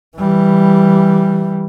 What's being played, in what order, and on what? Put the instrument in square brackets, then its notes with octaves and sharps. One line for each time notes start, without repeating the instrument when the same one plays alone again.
[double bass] E3 G3